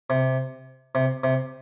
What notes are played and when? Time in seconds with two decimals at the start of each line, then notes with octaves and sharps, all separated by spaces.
0.10 C3
0.95 C3
1.24 C3